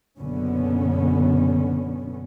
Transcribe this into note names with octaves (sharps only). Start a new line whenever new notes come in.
F#1 B2 D3 B3 C#4